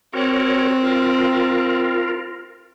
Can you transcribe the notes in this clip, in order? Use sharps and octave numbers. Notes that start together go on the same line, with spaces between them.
C4 F#4 A#4 C#5
F4 A#4